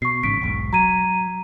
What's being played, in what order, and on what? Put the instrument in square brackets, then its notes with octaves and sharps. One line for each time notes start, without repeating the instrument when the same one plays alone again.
[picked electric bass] B2 [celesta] C#6 C7
[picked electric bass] A1 G#2 C#3 [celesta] B6 D7
[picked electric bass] E1 B1 G#2
[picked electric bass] F#3 [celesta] A#5 G#6 D#7